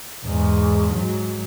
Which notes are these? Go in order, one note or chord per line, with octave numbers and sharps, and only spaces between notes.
E2 G#2
G#2 F#3